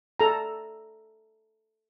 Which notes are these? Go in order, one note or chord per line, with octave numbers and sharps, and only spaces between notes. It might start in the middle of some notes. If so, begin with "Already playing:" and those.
A4 A#5